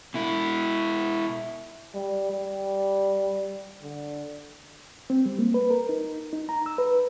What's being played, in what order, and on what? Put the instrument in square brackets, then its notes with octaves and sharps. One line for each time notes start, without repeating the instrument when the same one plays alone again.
[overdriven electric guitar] B2 E4
[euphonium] G3
G3
D3
[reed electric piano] C4
G3
A#3
B4
A#4
D#4
D#4
A#5
E6
B4